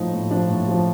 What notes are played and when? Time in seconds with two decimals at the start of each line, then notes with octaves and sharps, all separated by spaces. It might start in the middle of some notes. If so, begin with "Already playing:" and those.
Already playing: A2 F3 D#4
0.13 A2
0.31 F3 D4
0.49 A2
0.68 F3